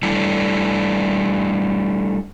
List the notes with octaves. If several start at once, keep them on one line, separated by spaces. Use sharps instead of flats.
G3 A3 D4 E4